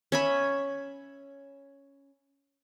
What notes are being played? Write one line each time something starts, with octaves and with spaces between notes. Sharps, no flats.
C#4 E5 B5